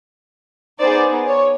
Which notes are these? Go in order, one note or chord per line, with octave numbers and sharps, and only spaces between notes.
B3 D#4 G#4 C5 D5
C#5